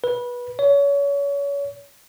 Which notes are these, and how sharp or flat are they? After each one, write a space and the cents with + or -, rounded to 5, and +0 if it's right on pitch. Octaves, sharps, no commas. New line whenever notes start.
B4 -20
C#5 +30